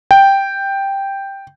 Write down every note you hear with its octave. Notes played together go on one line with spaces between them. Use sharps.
G5